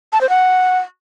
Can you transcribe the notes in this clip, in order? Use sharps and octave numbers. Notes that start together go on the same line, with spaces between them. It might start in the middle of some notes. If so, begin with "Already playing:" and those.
A5
C5
F#5